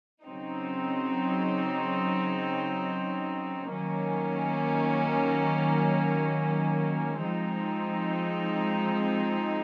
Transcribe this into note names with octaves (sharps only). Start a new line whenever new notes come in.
C#3 F#3 C4 D#4
D#3 F#3 A#3 C#4
F3 G#3 C4 D#4